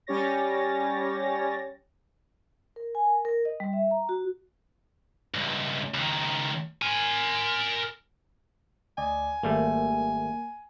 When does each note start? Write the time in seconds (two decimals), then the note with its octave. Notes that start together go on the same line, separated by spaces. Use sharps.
0.07 G3 C#4 G4 C#5 A6 A#6
2.76 A#4
2.95 G#5
3.06 A#4
3.25 A#4
3.45 D#5
3.60 G3
3.73 E5
3.91 A#5
4.09 F#4
5.34 C#2 G2
5.94 C#2 D#3
6.82 A#4 G#5
8.98 D2 D5 D#5 G#5
9.43 G#1 G3 A3 A#3